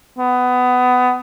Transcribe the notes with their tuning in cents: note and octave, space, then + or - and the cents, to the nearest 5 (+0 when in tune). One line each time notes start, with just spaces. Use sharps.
B3 +20